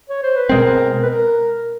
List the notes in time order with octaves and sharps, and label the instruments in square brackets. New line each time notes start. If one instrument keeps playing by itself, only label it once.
[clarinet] C#5
C5
B4
[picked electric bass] B2 G#3 C4 [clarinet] A#4
[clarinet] B4
A#4